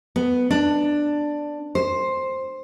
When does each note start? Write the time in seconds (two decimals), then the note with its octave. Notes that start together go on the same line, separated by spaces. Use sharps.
0.16 B3
0.51 D4
1.75 C5